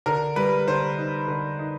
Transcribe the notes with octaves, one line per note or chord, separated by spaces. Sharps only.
D3 A#4
G3 B4
D3 C5
D#4
D3
D#4